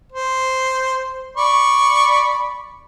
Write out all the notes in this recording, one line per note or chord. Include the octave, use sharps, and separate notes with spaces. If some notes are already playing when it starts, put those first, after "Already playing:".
C5
D5 B5 C#6